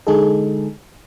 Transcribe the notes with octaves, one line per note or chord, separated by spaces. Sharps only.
D3 G#3 D#4 G#4 A4